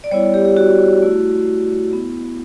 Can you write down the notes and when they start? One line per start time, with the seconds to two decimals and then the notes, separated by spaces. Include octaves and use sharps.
0.04 D5
0.11 G3 B3 E4 C#5
0.34 G4
0.45 G4
0.57 F#4
1.02 A3 E4
1.93 B3 E4